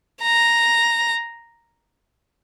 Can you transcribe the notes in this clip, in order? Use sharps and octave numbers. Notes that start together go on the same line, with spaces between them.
A#5